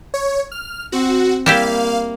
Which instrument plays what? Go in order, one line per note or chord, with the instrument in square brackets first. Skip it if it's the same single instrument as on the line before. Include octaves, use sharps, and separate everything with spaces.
[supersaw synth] C#5
F6
[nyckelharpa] C4 [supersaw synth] F#4
[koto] G3 E4 G4 [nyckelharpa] A#3 [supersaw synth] F5